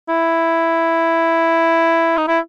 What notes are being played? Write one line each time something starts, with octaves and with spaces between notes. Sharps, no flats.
E4
D#4
E4